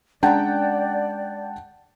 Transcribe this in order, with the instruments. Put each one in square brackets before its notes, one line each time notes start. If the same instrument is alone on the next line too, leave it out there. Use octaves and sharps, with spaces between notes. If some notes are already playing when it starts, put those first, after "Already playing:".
[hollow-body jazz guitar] G#3 C#4 A#5 [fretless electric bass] D4 [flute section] D5 [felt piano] F#5 G5 A5